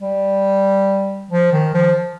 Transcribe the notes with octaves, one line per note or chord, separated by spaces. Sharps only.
G3
F3
D#3
F3